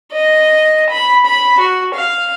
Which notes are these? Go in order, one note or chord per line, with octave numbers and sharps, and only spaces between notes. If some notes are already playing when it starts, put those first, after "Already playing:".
D#5
B5
B5
F#4
F5